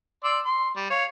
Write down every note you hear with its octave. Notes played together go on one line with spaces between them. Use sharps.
D5 C6 E6
C6
G3
C#5 F5